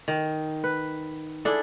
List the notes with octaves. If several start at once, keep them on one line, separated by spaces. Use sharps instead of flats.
D#3
B4
D4 E4 G#4 A4